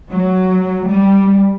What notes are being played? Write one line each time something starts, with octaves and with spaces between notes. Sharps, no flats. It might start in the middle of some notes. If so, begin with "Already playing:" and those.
F#3
G3